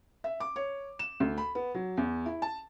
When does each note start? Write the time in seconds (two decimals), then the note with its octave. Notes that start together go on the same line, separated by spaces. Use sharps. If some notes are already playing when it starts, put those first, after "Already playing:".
0.24 E5
0.40 D6
0.56 C#5
0.99 E7
1.20 D2
1.38 B5
1.55 B3
1.74 F#3
1.97 E2
2.26 E4
2.42 A5